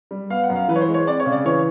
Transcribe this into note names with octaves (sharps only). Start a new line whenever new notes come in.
G3
B3 F5
F#5
F#2
F5
E3 B4
C#5
C5
G#3
C#5
C4 D5
C#5
C#3
D5
E3 C#5